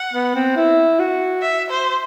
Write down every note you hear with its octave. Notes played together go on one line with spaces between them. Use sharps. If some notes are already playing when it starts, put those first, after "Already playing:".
Already playing: F#5
B3
C4
E4
F#4
E5
C5